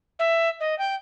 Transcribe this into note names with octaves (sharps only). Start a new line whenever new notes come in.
E5
D#5
G5